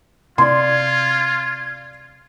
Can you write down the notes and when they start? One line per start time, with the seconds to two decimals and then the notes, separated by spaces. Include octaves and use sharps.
0.38 C3 F4 D5 C6 G#6